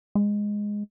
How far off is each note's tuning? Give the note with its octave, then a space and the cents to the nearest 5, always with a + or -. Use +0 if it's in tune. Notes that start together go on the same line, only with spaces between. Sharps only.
G#3 -5